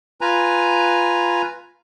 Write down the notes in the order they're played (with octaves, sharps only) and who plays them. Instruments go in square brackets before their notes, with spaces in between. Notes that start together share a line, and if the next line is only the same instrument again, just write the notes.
[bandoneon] F4 B4 G#5 A#5